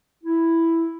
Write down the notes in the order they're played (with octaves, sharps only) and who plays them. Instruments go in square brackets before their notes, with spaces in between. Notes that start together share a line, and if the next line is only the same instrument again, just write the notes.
[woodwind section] E4